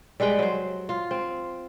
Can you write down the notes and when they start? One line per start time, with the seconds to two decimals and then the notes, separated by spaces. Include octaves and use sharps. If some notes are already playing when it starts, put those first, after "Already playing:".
0.20 G3 G#3 B4 G5
0.39 F#3 C5
0.89 F4
1.11 C4